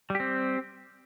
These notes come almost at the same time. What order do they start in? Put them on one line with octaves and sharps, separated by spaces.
G3 G4 C4